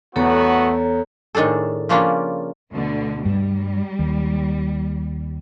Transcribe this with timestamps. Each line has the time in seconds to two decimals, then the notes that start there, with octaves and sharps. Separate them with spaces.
0.16 E2 A3 B3 F#4 A4 C#5 A#5
1.35 A2 D#3 D4 G#4 A4
1.89 C#3 F3 A#3 C#4 D4 F4
2.72 D2 B2 D3
3.25 G2 G3
3.99 D#2